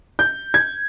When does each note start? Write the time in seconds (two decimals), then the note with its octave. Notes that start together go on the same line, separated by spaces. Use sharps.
0.19 G6
0.54 G#6